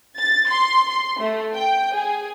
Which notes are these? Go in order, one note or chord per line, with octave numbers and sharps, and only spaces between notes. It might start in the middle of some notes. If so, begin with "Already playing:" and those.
A6
C6
C6
A3
G5
G#4